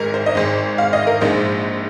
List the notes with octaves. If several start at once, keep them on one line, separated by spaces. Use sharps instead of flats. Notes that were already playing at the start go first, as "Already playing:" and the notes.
Already playing: G#1 G#2 G#3 A#4
C5
D#5
G#1 G#2 G#3 C5
F5
D#5
A#4
A#1 G#2 G#3 C5